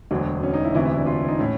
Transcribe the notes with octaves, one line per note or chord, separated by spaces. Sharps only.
E1 D2 D3 F#3
C#4
D#4
E4
E1 D2 C3 E3 E4
E4
D4
F4
D#4
A2 C#4